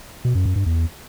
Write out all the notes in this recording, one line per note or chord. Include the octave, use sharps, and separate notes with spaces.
B2
F#2
F#2
G2
E2